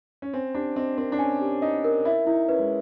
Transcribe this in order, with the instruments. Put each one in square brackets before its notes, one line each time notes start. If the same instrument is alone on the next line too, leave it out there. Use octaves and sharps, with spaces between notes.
[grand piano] C#4
[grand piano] C4 [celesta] G#5
[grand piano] D4 [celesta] G4
[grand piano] C4 [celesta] D#5
[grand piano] C4 [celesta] A#4
[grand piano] D4
[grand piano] C#4 [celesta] G#5
[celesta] G4
[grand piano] D#4 [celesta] D#5
[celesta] A#4
[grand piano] E4 [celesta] E5
[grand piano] D#4 [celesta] E4
[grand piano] C#4 [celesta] B4
[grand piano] G#3